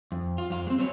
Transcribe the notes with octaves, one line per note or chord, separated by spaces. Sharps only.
F2
F4
F2 F4
G#3 C4
F#3 C4 C#4 C#5